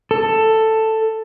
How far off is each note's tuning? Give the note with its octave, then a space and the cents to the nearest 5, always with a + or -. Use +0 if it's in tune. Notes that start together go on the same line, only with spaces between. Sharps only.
A4 +5